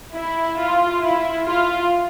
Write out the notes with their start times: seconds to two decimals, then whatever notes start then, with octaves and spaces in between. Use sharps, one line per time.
0.15 E4
0.58 F4
1.02 E4
1.46 F4